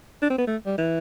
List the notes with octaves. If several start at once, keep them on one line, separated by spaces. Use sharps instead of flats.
D4
C4
B3
A3
G3
E3